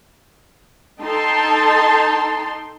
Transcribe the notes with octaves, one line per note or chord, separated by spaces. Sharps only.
D#4 A4 G5 A5 C6